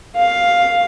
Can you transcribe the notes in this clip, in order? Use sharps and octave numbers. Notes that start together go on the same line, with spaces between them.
F5